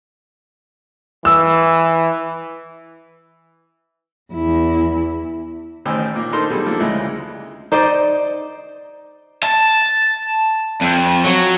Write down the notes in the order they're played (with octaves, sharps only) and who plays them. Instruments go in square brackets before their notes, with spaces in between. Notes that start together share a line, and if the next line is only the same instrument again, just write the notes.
[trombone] E3 [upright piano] E6
[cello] E2 E4
[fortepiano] A1 A2 D#3 C5 G#5 E6
A#2 A#3 D6
D4 D#4 A4 A#4 C5 C6
B1 G3 G#4 A4
F3 A#3 C4 D4 A4
D2 C#3 G#3 E4 D#5
[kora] D#4 C5 D5 D#5
[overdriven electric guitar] A5
F2
F#3